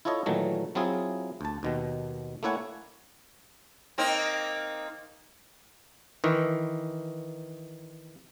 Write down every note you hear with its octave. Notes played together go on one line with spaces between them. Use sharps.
E4 F4 A4 C#5 D#5
A#2 D#3 E3 F#3 A3
F#3 C4 E4 F4 G#4
D2 A5
D#2 B2 D#3
A3 A#3 E4 C#5 F#5 G#5
A#3 C4 D#4
D#3 E3